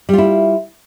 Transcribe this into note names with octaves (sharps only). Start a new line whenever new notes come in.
G3 E4 F4